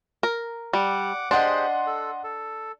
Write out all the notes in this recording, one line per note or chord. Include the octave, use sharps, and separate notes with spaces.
A#4
G3 F#5 D6
D4 G4 G#4 C5 D#5 F#5 C6
A4
A4